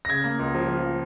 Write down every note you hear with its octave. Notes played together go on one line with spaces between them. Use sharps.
A#6
C#3 G#6
A#3
C#2
F3
F3
F3